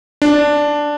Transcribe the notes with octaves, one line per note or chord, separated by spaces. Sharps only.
D4